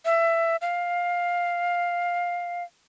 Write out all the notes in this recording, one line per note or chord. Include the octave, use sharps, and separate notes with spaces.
E5
F5